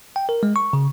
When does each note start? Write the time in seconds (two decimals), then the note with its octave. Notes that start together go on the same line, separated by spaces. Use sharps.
0.16 G5
0.29 A#4
0.43 G#3
0.56 C#6
0.73 C#3